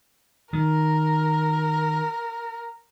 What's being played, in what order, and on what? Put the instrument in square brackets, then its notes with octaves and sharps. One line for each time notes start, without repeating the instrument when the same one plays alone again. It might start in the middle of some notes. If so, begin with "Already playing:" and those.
[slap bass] D#3 [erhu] A#4